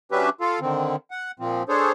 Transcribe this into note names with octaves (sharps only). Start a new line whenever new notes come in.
F#3 C#4 D4 G4 B4 E5
F4 A4 F5
D3 D#3 C4
F#5
A#2 F3 C4
D4 G#4 A4 C5 C#5